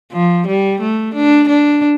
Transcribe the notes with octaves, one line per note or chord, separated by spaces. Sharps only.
F3
G3
A3
D4
D4